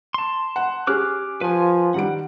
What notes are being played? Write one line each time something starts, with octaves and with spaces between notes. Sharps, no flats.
A5 C6
F#5
C#4 G4 G#4 D6 F6 F#6
F3 B4 G#5
D#3 G3 F#5 D7